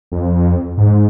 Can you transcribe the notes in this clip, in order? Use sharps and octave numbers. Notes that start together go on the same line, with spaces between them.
F2
G#2